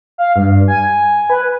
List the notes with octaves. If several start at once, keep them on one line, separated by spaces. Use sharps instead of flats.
F5
G2
G#5
B4